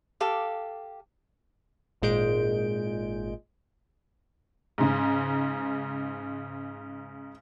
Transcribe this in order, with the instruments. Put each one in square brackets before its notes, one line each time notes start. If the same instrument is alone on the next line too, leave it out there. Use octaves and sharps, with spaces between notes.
[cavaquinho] G4 A4 F5 D6
[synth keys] G#1 A#2 G#3 G6 D7
[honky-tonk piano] G#2 C#3